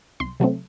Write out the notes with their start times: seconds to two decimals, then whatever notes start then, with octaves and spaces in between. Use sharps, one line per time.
0.20 C2 C6
0.40 C3 F#3 A3 C4